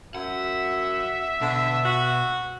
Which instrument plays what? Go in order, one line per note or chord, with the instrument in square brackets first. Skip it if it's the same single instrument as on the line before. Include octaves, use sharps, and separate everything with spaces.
[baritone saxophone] F#2 [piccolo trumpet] E5 [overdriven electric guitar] F#5
[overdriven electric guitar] B2 [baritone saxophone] D3
[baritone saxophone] F#4